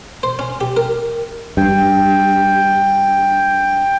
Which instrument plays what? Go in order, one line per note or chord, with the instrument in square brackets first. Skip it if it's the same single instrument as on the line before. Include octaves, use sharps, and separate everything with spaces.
[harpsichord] C5
C#4
G4
A#4
[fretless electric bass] G2 [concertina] G5